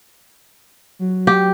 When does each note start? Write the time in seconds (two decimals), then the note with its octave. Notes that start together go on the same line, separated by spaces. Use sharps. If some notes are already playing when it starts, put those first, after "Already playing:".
0.99 F#3
1.27 G4